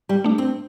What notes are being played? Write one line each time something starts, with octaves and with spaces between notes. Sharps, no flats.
G3
A3 D4
C4